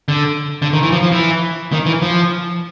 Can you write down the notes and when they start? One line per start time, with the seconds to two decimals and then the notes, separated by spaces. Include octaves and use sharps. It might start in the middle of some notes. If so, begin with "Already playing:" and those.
0.08 D3
0.62 D3
0.73 D#3
0.83 E3
0.92 F3
1.02 F3
1.12 E3
1.72 D#3
1.86 E3
2.02 F3